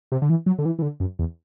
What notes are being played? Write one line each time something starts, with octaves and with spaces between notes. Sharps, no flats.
C3
D3
E3
F#3
D3
E3
E3
D3
F#2
E2